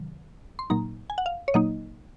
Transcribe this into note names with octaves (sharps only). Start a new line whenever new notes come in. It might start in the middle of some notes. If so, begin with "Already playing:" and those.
Already playing: C3 D#3 F#3
C6
A#2 F#3 A#3 D#4 A#5
G#5
F#5
F5
C#5
A#2 F#3 A#3 D#4 D#5